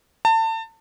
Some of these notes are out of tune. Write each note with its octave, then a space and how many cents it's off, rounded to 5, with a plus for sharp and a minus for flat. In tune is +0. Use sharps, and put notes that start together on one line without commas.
A5 +30